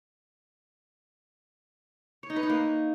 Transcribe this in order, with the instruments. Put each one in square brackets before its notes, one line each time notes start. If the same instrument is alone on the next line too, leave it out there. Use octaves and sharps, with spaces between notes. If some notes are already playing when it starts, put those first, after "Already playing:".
[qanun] C#5
D#4
B4
D#4
A#3